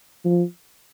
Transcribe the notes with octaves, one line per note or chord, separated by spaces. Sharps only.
F3